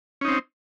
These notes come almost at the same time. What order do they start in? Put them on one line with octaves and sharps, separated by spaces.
C#4 D#4 C4